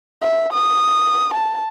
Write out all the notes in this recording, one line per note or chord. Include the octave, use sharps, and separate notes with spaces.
E5
D#6
A5